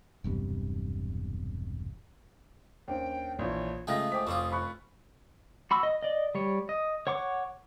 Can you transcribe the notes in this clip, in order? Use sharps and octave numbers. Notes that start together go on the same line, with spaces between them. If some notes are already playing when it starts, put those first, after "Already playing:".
E1 B1 G2 C3
D#2 C#4 D4 C5 G5
A#1 E3 C#5
C#3 G#3 A3 F4 G5 D#6 A#6
C5 G5 G#5 D6 B6
F1 C4 C#4 F4 C5 C#6 D6 E6
B5 C#6 F#6
F#4 B5 C#6 E6
D#5
D5 D#5
G3 C#5
D#5
C#5 F#5 C#6 D6